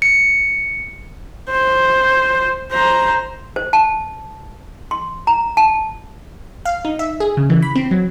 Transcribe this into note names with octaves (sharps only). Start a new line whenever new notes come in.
C#7
C5
C5 A#5
C5
A5
C6
A#5
A5
F5
D#4
E5
G#4
C#3
E3
B5
C4
F#3